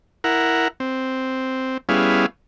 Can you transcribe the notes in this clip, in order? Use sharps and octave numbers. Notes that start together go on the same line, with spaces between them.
E4 A#4 F#5
C4
G3 B3 C#4 E4 G#4 F5